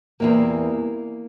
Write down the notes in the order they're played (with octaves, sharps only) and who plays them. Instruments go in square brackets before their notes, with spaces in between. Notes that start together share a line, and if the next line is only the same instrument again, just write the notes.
[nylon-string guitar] E2 C3 E3 G3 A#3